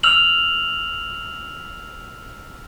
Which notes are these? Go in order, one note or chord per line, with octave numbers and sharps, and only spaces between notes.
E6 F6 F7 F#7